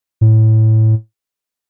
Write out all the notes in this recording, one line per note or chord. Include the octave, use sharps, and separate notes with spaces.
A2